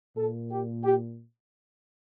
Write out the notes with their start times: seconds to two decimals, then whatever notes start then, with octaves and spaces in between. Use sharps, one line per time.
0.17 A#2 A4
0.51 G4
0.84 G4